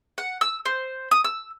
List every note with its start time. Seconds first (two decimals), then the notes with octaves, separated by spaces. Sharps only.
0.18 F#5
0.41 E6
0.66 C5
1.11 D#6
1.24 E6